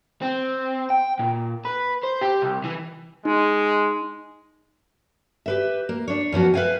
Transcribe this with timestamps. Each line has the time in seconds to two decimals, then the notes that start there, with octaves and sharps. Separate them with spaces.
0.22 C4
0.90 G5
1.19 A#2
1.65 B4
2.04 C5
2.21 G4
2.42 C2
2.64 E3
3.25 G#3 D#4
5.46 G4 B4 E5
5.89 A#3
6.08 D4 C#5
6.32 F#2 F3 B3 F#4
6.54 B4 D5 E5 F5 G5 G#5